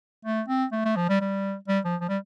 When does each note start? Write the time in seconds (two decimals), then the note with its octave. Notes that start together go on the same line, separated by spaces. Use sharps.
0.25 A3
0.48 C4
0.72 A3
0.85 A3
0.96 F3
1.09 G3
1.21 G3
1.68 G3
1.85 F3
2.01 F3
2.09 G3